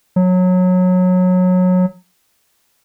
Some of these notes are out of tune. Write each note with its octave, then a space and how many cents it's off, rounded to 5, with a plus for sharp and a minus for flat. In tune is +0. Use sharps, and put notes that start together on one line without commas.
F#3 -20